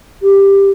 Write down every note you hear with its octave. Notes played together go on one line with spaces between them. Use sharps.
G4